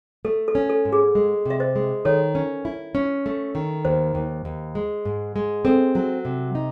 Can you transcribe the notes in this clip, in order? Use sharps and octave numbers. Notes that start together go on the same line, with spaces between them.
A3 A4
A4
C#4
A4
G#2
G#4
G#3
C3 E5
C5 D#5
G#3
D#3 A4 C#5
C#4
E4
C#4
A3
D#3
D#2 C5
D#2
D#2
G#3
G#2
G#3
C4 A4
F#3
C3
D#4